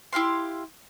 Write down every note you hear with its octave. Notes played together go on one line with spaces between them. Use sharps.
E4 G4 F5 C6